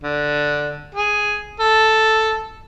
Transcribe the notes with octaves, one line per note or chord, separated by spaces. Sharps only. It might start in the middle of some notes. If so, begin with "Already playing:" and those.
D3
G#4
A4